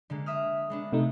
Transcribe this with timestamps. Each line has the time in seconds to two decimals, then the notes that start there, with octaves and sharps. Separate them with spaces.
0.10 D3 G#3 A#3
0.26 E5 D#6 F6
0.70 G#3 B3 D4
0.92 C3 A3 D#4